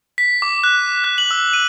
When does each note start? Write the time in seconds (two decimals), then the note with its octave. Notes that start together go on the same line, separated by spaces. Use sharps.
0.18 B6
0.42 D6
0.64 F#6
1.04 F#6
1.18 F#7
1.31 E6
1.53 D#7